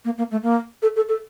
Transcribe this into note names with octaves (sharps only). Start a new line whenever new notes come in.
A#3
A#3
A3
A#3
A4
A4
A4